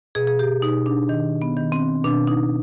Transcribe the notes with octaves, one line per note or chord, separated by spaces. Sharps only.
B2 G#4
G#4
G4
B2 D#4
D4
D#3
B3
D#3
C4
B2 D4
D#4